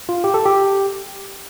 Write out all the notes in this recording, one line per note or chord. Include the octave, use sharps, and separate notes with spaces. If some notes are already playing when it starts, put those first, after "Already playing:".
F4
G4
A4
G4